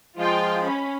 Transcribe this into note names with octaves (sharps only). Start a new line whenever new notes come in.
F3 G#3 F4 G5
C#4 B5